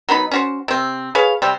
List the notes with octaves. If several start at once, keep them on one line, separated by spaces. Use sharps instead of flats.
F#3 B3 D#4 B5
C#4 F#4 C5
C3 C4
G#4 B4 C#5 F5
C3 G3 C4